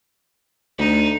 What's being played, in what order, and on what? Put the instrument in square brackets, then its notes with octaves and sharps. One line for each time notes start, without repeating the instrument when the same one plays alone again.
[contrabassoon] D2 [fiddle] D#4